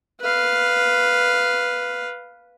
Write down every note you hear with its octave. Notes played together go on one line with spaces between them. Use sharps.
B4 F5